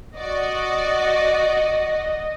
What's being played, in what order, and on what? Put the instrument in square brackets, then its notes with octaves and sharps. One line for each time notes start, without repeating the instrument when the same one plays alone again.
[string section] F#4 D5 [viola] D#5